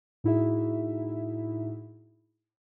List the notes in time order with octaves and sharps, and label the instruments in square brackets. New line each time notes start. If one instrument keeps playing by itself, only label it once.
[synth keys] A2 D#4 E4 F#4 G#4 E5